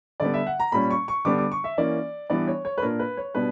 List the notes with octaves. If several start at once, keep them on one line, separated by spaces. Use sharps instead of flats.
D3 G3 B3 D5
E5
F#5
A#5
A#2 G3 C#4 B5
C#6
C#6
D3 G3 B3 D4 D6
D6
C#6
E5
E3 A#3 C#4 D5
E3 G3 B3 D4 D5
C#5
C#5
B4
A#2 A#3 D4 A#4
B4
C#5
B2 G3 B3 D4 B4